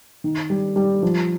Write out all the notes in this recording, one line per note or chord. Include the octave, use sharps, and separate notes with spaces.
D#3
G3
G3
F3